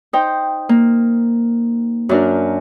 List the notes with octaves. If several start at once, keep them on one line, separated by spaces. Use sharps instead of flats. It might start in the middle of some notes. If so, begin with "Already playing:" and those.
D#4 C5 G5
A#3
F#2 D4 A#4